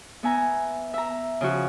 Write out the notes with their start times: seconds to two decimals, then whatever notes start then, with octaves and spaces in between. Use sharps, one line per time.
0.23 B3 E5 G#5 A#5
0.94 E5 A#5
1.41 C#3 F3 F#4